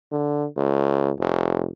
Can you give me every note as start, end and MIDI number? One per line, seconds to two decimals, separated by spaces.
0.12 0.46 50
0.57 1.11 37
1.19 1.69 29